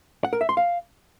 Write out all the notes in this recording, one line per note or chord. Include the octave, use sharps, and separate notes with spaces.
F#5
A#4
E5
C6
F5